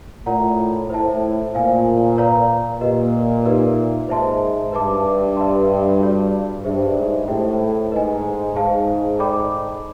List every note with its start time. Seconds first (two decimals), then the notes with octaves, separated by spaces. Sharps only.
0.26 A2 F4 A#4 D5 F#5 A#5
0.90 A2 C5 E5 A5
1.54 A#2 C5 F5 G#5
2.17 B4 D5 F5 A#5
2.81 A#2 G4 B4 D#5
3.45 D#4 G4 B4 E5
4.08 G#2 C5 E5 A5 C6
4.72 G2 B4 E5 A5 D6
5.37 B4 E5 A5 C6
6.00 F#4 A4 D5
6.64 G2 G#4 C5 E5
6.97 G#2
7.27 A2 G4 C5 E5 G5
7.92 G#2 B4 D#5 G#5
8.55 G#2 G#4 C5 F5 A5
9.19 A4 D5 G5 B5 D6